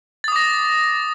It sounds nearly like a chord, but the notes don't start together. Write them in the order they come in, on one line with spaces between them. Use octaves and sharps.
A6 D#6 D6 A#6